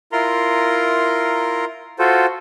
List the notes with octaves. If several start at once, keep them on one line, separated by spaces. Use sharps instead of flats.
E4 F4 A#4 A#5 C6
F4 F#4 A4 C5